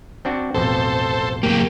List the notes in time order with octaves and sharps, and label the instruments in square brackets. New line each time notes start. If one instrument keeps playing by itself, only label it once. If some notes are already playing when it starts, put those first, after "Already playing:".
[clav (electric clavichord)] C4 D4 F#4
[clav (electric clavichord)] A1 F2 B2 [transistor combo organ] A4 C5
[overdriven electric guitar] F#2 A#3 [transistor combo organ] G4